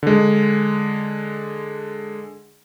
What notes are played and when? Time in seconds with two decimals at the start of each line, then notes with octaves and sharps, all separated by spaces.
0.03 D3 G#3